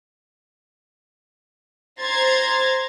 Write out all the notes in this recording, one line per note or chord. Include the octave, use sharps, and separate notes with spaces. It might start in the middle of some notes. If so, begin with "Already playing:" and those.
C5 A#5 C6 G#6 A6